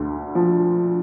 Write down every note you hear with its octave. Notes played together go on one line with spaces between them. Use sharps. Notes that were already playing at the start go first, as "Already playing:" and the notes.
Already playing: D2 D3
F3